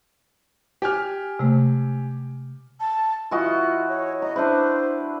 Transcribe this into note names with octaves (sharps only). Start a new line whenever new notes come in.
G4 G#5 F6
C3 G#3 A3
A5
E3 F4 F#4 D#5
C#5
D#5 A#5
D4 E4 B4 C5